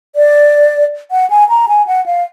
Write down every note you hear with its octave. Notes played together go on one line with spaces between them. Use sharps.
D5
F#5
G#5
A#5
G#5
F#5
F5